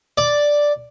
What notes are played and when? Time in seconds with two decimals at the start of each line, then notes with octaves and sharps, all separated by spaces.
0.18 D5